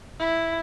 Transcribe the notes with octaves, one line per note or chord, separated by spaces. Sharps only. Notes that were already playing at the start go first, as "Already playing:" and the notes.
E4